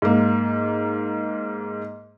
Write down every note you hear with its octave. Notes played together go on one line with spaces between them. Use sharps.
G#2 A#3